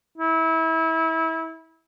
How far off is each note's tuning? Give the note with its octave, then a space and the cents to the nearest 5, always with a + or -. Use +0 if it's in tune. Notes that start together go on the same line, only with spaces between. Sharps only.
E4 -25